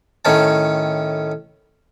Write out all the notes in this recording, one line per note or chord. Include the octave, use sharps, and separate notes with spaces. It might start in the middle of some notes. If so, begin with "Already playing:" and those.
A2 D#3 C#4 A5